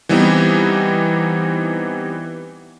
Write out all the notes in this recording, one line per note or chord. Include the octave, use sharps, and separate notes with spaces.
E3 G3 B3 C4 D#4 G4